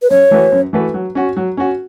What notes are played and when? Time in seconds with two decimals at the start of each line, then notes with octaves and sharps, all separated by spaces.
0.02 B4
0.10 F#2 C#5
0.31 E3 A3 F#4 B4
0.52 F#2
0.73 E3 A3 F#4 B4
0.94 F#3
1.15 C#4 F#4
1.37 F#3
1.57 C#4 F#4